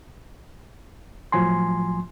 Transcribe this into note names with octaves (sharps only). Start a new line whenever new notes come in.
A2 F3 F#3 G#5 C6